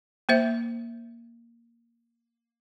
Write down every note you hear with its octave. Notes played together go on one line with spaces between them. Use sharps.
A#3 C5 E5